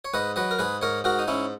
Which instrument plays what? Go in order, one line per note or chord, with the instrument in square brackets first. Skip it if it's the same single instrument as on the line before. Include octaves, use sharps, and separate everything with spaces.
[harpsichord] C#5
G#2 B4 D#5
F#3 B4 D#5
A#4
G#2 G#4 B4
G#2 A#4 C#5
G#2 F#4 A#4
D#4
G#2 C#4 E4